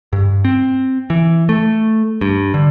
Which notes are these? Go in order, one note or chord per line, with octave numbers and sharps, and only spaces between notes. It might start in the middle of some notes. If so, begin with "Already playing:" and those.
G2
C4
E3
A3
G2
D3